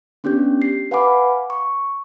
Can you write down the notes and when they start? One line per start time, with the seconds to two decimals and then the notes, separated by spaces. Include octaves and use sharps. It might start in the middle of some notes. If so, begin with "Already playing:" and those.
0.24 B3 C#4 D4 G4 G6
0.62 C7
0.91 B4 F5 F#5 G#5 B5 D6
1.50 C#6